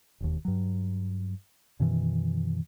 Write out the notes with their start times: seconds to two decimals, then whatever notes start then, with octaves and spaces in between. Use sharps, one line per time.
0.21 E1 D#2
0.45 G2 F#3
1.80 F#2 B2 D#3 E3